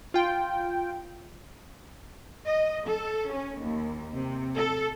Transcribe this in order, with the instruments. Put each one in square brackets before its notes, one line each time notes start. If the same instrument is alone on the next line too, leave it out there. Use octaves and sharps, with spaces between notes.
[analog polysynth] F4 G5
[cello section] D#5
A4
C#4
D#2
C3
A4